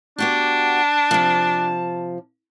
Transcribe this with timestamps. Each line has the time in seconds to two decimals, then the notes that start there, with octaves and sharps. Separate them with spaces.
0.18 B3 D4 F#4 G4 A5
1.11 C3 F3